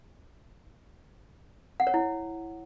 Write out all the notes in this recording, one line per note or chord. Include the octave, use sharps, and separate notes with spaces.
F#5
C#5
E4